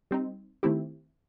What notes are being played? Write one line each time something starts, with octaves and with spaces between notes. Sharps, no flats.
G3 C4 D#4
D#3 A3 C4 E4 G4